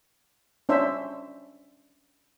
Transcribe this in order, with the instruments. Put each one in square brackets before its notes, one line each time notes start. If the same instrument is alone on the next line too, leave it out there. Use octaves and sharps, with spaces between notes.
[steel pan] C#4 D4 C5 E5